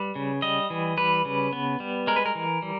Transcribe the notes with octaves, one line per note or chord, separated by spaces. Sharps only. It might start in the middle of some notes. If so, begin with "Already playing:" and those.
Already playing: G3 B4
C#3
G3 D#5
E3
G3 B4
C#3
B3
G3
G#3 A#4
B4
A#4
E3
G3